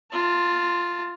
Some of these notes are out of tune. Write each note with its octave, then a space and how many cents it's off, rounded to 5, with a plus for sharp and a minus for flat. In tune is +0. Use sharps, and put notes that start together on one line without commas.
F4 +0 A5 +25